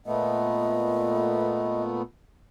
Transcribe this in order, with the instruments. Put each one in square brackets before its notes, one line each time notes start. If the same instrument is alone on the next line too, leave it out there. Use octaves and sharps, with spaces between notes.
[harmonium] A#2 A3 B3 [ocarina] D#5